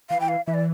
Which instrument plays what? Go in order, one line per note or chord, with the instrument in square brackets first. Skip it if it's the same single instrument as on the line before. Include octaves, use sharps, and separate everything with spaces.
[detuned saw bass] E3 [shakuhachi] F5
[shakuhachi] G5
F5
[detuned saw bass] E3 [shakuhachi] E5
[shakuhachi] D5